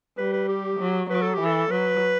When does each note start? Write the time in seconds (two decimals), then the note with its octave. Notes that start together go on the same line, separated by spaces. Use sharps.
0.18 G3 B4
0.33 B4
0.49 G4
0.79 F#3
1.10 F#3 B4
1.22 A4
1.34 G4
1.40 E3
1.46 A4
1.70 F#3 B4